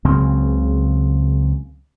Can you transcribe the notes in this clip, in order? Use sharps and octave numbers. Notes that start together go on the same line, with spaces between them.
C#2 C#3 F#3 C4